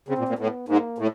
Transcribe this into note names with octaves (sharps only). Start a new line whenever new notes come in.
C#3 C4
A#2
A#2
A2 B3
G#2 A#3
A2